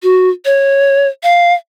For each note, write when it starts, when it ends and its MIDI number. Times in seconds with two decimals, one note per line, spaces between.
0.03 0.29 66
0.45 1.08 73
1.23 1.54 77